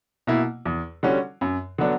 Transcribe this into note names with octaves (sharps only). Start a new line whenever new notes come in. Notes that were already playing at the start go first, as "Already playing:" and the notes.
B2 A#3 E4
E2
D3 G3 C#4 F#4
F#2
D3 F#3 B3 D4